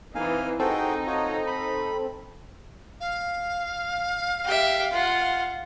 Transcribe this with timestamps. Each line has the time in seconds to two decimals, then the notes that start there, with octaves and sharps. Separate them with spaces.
0.15 E3 C4 D#4 F5 G#5
0.59 C4 D#4 F#4 G#4 A4 G5
1.07 F4 F#4 C#5
1.47 B5
3.00 F5
4.45 G4 E5
4.93 F4 F#5